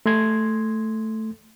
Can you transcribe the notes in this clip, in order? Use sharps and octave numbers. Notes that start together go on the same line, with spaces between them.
A3 C6 G#6